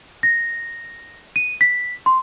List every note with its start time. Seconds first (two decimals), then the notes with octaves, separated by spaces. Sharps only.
0.23 A#6
1.36 D#7
1.61 B6
2.06 C6